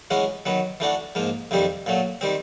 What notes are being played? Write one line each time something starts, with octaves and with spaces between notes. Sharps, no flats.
E3 G#3 C#4 F#4
D#3 F#3 B3
E3 A3 D4 F#4
G#2 F3 A#3
F2 C3 D#3 G3 C4
A#2 F#3 A3
D#3 G3 C4